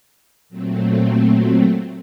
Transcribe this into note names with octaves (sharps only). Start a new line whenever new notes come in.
A#2 F#3 A3 C4